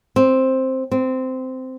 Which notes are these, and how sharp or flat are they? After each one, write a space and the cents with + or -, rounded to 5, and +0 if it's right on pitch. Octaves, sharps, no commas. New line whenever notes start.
C4 +5
C4 -15